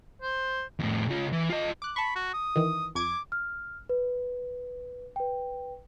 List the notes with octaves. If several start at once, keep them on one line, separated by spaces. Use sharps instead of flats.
C5
F2 A2
C#3 F4
E3
F4 D#5
D6 F#6
A5 B5 C#6
F#4
D#6
D#3 E3
F2 D6 G#6 D7
F6
B4
B4 G5